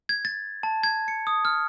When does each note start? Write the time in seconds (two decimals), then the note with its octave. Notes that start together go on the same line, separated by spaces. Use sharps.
0.09 G#6
0.25 A6
0.63 A5
0.84 G#6
1.08 C#7
1.27 D#6
1.45 F6